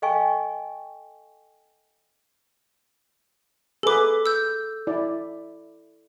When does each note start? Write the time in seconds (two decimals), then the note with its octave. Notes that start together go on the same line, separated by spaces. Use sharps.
0.02 A4 D#5 F5 G5 G#5 C#6
3.83 G#4 A4 B4 D6
4.26 E6 G6
4.87 E4 D5